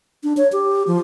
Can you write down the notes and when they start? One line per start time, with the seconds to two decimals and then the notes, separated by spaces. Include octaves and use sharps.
0.24 D4
0.37 C#5
0.52 G4
0.87 F3